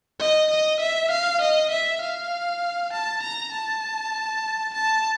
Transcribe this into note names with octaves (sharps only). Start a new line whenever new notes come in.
D#5
D#5
E5
F5
D#5
E5
F5
A5
A#5
A5
A5